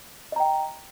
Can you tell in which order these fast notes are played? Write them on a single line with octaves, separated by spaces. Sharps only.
D#5 A#5 G5